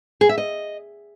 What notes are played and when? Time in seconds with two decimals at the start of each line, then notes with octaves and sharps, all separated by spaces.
0.21 G#4
0.29 E5
0.38 D#5